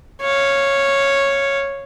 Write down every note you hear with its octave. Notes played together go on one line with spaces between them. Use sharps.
C#5 F5